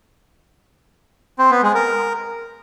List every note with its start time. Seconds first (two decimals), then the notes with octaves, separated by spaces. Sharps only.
1.39 C4
1.51 B3
1.63 G#3
1.75 A#4